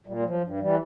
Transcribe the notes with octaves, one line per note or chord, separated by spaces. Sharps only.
A#2 G3
G3
F3
F#3
G2
E3 G3